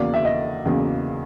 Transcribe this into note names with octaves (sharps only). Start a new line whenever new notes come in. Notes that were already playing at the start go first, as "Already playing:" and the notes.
Already playing: E2 C#3 F#3 A#3 D5
E5
D#5
E2 C#3 F#3 A#3